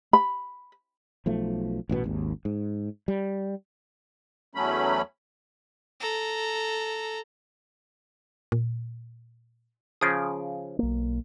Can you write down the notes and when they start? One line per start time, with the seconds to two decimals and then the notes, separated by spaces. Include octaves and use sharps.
0.13 B5
1.26 B1 F3 A3
1.89 A1 G2 B2 B3
2.04 G#1 D#2
2.45 G#2
3.08 G3
4.55 E2 F#3 A3 C#4 B5
6.00 A4 A#5
8.52 A#2
10.01 C#3 F3 G#4 D#6 D7
10.79 B1 A#3